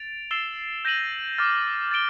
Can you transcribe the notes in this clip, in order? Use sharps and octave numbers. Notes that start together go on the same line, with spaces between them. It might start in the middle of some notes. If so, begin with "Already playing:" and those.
Already playing: A6 D7 F7
E6 A6 C7 E7 G7
G6 A#6 D#7 F#7
D6 F6 A6
A6 D7 G7